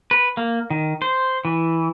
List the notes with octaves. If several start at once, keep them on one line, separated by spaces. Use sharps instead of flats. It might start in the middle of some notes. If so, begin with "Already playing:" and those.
B4
A#3
D#3
C5
E3